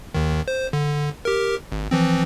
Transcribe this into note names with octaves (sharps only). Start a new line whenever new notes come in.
D#2 D#3
C5
D3
G4 A#4
G#1
E3 F3 C4